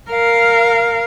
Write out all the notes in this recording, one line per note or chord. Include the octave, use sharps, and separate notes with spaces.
A#4 F5